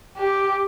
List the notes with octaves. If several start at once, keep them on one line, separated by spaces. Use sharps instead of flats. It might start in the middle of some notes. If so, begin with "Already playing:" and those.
G4